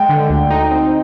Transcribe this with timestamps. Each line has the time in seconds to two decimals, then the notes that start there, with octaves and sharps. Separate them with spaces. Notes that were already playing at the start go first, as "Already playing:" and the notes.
Already playing: G#3 G5
0.09 D3
0.30 D2
0.51 D#4
0.71 C4